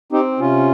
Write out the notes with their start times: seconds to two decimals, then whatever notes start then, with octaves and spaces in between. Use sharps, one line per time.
0.12 C4 D#4 G4
0.40 C3 C#4 F4